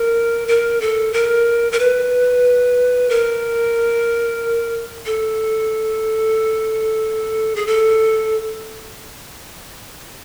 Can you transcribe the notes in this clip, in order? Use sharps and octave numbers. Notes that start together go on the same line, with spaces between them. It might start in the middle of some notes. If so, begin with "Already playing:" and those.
Already playing: A#4
A#4
A4
A#4
A#4
B4
A#4
A4
G#4
A4